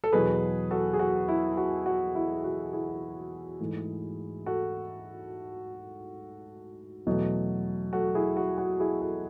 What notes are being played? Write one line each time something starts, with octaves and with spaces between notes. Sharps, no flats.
A4
E2 B2 F#3 G#4 B4
F#4 A4
G#4
F#4
E4
F#4
F#4
E4
F#4
E4 G#4
G#2 E3 A3
F#4 A4
E2 B2 F#3 A3
F#4 A4
E4 G#4
F#4
F#4
E4 G#4
F#4 A4